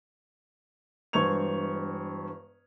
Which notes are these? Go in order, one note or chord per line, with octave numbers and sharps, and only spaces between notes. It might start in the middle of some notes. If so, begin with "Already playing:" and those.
E1 G2 C5 C#6 G#6 F7